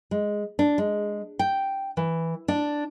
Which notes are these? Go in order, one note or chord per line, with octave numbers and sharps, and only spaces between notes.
G#3
D4
G#3
G5
E3
D4